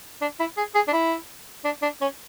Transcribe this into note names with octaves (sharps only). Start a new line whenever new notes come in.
D4
E4
G#4
G#4
D4
E4
D4
D4
C#4